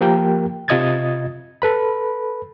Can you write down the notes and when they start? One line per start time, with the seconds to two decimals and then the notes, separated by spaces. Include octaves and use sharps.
0.01 F3 A#3 G4 A#4 G5
0.68 C3 F4 D#5 D#6 G#6 A6
1.62 A4 B4 B5